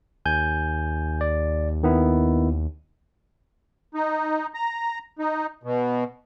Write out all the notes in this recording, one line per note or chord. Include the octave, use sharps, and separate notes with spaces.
D#2 G#5 G6
D5
D#3 B3 E4
D#4
A#5
D#4
B2